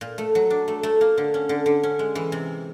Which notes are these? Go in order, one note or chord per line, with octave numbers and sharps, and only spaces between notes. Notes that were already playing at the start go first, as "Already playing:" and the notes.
A#2
A3
F#3
D4
A3
A3
A#3
D3
C#4
D3
D3
C#4
G#3
E3
C3